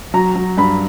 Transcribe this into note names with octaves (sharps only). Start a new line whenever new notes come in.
F#3 A#5
F#3
G2 B5